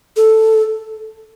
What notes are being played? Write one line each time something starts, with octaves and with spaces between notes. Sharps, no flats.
A4